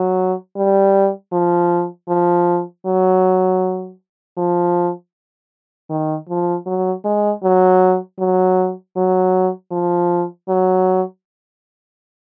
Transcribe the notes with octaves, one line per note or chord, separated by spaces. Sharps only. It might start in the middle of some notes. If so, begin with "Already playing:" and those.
Already playing: F#3
G3
F3
F3
F#3
F3
D#3
F3
F#3
G#3
F#3
F#3
F#3
F3
F#3